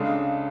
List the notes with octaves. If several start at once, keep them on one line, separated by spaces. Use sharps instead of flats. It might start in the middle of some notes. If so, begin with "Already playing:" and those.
Already playing: C#2 C#3 G#3 D4 A4